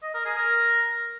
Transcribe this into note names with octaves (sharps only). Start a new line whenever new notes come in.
D#5
A#4
G#4
A#4